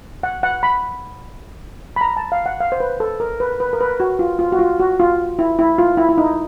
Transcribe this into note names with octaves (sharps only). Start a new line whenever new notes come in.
F#5
F#5
B5
B5
A#5
A5
F5
F#5
F5
C5
B4
A4
A#4
B4
B4
A#4
B4
F#4
F4
F4
F#4
F4
F#4
F4
E4
E4
F4
E4
E4
D#4